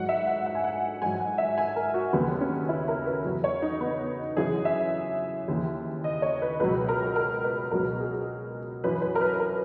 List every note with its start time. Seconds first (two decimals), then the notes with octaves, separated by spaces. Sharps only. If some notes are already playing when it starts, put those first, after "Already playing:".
Already playing: G#2 F#3 F#5
0.09 E5
0.27 F#5
0.46 F#5
0.55 G#5
0.64 F#5
1.02 G#2 F#3 G#5
1.20 F#5
1.38 E5
1.58 G#5
1.76 A#4
1.94 F#4
2.13 D#2 C#3 F#3 B3
2.41 C#4
2.69 E4
2.88 A#4
3.06 B4
3.25 E2 C#3 F#3
3.44 C#5
3.62 D#4
3.81 B3
4.37 F#2 C#3 E3 G#4
4.65 E5
5.48 D#2 C#3 E3
6.04 D#5
6.22 C#5
6.42 B4
6.60 C#2 B2 F#3 B4
6.89 A#4
7.16 A#4
7.44 B4
7.71 C#2 B2 F#3 A#4
8.00 G#4
8.84 F#2 E3 B4
9.02 B4
9.15 A#4
9.21 B4
9.40 A#4